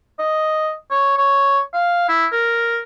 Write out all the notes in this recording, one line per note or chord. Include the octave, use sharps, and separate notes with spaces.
D#5
C#5
C#5
F5
E4
A#4